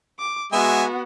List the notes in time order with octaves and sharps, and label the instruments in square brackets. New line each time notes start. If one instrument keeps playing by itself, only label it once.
[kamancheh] D6
[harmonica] G#3 E5 G#5 [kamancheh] B3 F#4